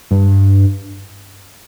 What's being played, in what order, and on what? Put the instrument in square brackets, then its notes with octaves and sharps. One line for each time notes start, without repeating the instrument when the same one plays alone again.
[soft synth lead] G2